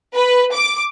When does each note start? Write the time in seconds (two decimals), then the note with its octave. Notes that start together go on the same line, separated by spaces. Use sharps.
0.15 B4
0.54 D6